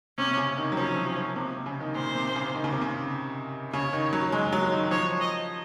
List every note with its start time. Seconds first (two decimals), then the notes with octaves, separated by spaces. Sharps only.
0.18 C3 C#4
0.31 C3
0.38 C#3
0.57 D#3
0.72 F#3
0.77 F3 C#4
0.97 F#3
1.16 F3
1.36 C3
1.51 C3
1.66 C#3
1.80 D#3
1.95 A#2 C5
2.15 C3
2.35 C#3
2.54 D#3
2.64 C#3
2.73 C3
2.82 C#3
3.73 C#3 C#5
3.93 D#3
4.13 F#3
4.32 G#3
4.53 F#3
4.72 D#3
4.91 F3 C#5
5.21 D#5